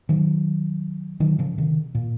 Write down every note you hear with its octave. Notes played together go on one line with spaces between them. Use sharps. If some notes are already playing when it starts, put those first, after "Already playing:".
D#3 F#3
D#3 F#3
C#3 F3
C3 D#3
A#2